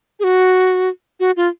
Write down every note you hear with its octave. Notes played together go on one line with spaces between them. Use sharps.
G#4
F#4
F#4
F4